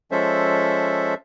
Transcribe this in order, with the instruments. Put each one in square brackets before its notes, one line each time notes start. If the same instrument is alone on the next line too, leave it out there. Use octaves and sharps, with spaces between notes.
[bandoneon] F3 G#3 C#4 A4 C5 E5